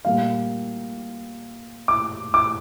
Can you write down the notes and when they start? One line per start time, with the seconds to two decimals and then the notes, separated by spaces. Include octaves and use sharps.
0.05 A#2 G3 A#3 F5
1.88 D6
2.34 D6